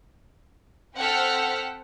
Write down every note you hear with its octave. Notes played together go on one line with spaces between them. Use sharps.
C4 A4 F#5 G5 F6 B6